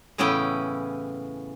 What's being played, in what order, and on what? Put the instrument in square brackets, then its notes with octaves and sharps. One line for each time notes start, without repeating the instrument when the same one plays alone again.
[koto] A2 C#3 E3 B3 C#4 G5